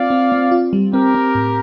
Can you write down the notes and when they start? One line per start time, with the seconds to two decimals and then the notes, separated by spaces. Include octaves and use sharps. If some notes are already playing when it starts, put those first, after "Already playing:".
Already playing: C4 F4 D5 F5
0.10 C4
0.32 C4
0.51 F4
0.73 G3
0.93 C4 G4 A#4
1.15 C4
1.35 A2